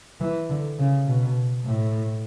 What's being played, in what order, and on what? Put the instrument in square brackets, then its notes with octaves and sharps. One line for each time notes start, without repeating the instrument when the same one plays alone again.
[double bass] E3
D3
C#3
B2
A2